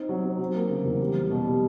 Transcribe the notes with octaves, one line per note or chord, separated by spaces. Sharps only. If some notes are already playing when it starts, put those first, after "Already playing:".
Already playing: C4 D#4
F#3
C4
F#3
A#3
C#3
E2
G3
G3
B2
G3